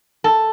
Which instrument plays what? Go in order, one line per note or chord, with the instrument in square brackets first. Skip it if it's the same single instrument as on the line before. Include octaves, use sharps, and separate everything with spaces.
[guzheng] A4